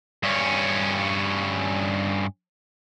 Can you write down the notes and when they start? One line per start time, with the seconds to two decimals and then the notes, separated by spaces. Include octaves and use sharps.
0.23 G2 C#4